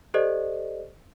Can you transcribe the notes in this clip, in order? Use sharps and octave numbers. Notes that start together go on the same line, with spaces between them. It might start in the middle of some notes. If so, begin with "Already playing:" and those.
G4 A4 C5 D5 D#5